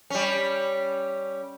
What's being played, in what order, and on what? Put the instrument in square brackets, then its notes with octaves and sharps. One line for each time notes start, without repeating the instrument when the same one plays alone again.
[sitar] G3 C#4